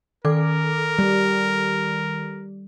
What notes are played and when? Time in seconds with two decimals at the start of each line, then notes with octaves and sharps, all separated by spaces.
0.25 D#3 A4 A#4 D6
0.99 G3